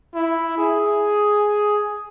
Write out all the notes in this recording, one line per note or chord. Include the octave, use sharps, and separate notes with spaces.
E4
G#4